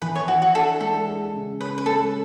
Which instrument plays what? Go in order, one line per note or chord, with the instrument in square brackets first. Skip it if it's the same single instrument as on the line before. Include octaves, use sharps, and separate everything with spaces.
[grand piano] E3 [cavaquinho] B4
[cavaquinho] C#5
[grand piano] E3 [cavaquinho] F#4
[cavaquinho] F#4
[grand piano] D4 [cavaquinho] A4
[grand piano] G#3 [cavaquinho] A4
[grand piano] G#4
C#3
[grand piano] C#4 [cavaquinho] B4
[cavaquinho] B4
[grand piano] G#3 [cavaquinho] A4